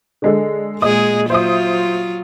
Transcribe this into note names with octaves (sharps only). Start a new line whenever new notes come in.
D3 G#3 A4
A#2 G#3 G#4 D#5 D#6
F#3 F4 C5 E5 D#6